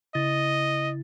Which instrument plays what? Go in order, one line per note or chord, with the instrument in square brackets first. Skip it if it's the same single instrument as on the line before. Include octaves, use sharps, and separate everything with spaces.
[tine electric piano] C#3 E4 A6 [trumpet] D#5